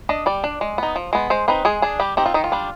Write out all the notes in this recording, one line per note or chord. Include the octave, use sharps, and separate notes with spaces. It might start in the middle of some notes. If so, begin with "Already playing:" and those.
D4 D#5
G3 D5
D4
G#3
B3 D#4
F3
G#3 B3
G#3 C5
C4 D#4 B4
G#3 G#4
D4 G#4
G3 G4
C4 D#4 G4
F4
D#3 D#4
F4
G3 D4